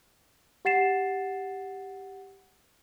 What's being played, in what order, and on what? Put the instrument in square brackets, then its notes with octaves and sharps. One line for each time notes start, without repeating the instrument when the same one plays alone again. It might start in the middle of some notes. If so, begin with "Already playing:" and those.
[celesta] G4 F#5 A6 C7 E7